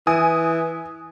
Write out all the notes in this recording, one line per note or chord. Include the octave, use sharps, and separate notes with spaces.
E3 G#5 D#6